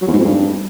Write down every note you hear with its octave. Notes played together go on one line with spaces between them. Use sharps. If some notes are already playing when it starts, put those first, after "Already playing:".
F#3
E2
G#2
F2
G2